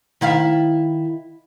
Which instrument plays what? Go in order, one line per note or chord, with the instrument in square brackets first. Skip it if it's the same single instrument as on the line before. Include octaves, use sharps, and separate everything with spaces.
[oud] D#3 E4 F5